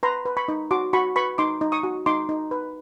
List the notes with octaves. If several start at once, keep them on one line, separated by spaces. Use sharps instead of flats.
B4 A#5 C6
B4
B5 C#6
D#4
F#4 C6 D6
F#4 B5 C#6
B4 B5 C#6
D#4 C6 D6
D#4
C#6 D#6
F#4
D#4 C6 D6
D#4
B4